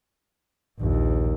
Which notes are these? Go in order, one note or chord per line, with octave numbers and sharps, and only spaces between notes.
A#1 D#2